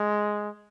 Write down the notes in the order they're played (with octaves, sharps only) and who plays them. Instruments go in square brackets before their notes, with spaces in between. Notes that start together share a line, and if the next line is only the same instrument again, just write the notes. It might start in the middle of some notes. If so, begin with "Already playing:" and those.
Already playing: [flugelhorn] G#3